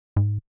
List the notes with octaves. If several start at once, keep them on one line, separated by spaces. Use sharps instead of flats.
G#2